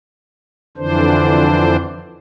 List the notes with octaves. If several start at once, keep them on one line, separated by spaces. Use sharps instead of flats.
F2 D3 E3 D4 C5